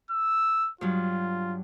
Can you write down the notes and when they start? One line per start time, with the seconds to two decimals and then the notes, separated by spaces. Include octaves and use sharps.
0.11 E6
0.81 G2 F#3 F4